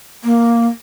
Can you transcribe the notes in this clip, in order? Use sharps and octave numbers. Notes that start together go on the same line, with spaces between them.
A#3